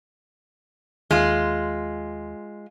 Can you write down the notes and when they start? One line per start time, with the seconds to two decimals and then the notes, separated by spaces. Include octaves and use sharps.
1.11 D#2 G#3 F4